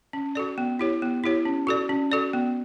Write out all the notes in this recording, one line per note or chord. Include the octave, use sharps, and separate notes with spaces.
C#4
F#4 A4 D5
B3
E4 G4 C#5
B3
E4 G4 C#5
C#4
F#4 A4 D5
C#4
F#4 A4 D5
B3